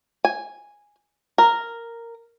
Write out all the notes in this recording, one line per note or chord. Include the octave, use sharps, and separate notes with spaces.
G#5
A#4